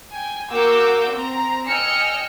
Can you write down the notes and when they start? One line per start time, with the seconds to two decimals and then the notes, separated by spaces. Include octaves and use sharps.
0.11 G5 G#5
0.51 A#3 F#4 D6 E6 G6
1.13 C4 A#5
1.66 D#5 G5 G#5 E6 F6 C#7